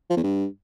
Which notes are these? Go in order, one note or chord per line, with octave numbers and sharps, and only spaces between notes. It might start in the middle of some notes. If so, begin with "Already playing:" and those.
F3
E2
G2